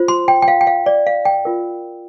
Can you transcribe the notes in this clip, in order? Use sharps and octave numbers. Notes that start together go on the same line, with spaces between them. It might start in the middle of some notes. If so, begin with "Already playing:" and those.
Already playing: F4 C5
C6
G5
G5
F5
G5
F5
D5
F5
G5
F4 A#4